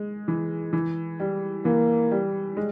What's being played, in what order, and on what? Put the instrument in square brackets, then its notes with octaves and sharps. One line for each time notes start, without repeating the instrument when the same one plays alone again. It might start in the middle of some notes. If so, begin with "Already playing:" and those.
Already playing: [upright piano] G#3
E3
E3
G3
[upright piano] E3 [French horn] A#3
[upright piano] G3
G#3